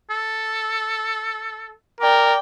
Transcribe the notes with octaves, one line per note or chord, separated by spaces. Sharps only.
A4
A#4 D5 G5